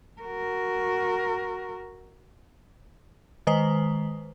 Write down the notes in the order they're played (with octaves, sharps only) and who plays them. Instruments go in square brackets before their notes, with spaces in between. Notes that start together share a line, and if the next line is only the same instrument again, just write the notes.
[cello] F#4 A#4
[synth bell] D#3 G#3 B4 C5